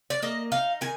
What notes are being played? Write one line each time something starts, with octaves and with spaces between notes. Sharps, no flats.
D5
A#3 D#5
D#4 F5
D#3 G#5